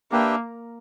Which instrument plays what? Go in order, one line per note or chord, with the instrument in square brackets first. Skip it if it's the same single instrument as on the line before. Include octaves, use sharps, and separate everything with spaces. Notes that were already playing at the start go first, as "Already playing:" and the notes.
[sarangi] A#3 [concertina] D4 G4 B4 E5 G5